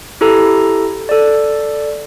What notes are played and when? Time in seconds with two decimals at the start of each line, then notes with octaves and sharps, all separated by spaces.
0.21 E4 G4 A4 A#5
1.09 A4 D5